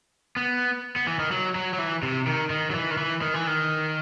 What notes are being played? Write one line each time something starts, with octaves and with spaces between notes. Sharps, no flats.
B3
B3
E3
D#3
F#3
F#3
F#3
E3
C3
D#3
D#3
F#3
E3
D#3
E3
D#3
E3
D#3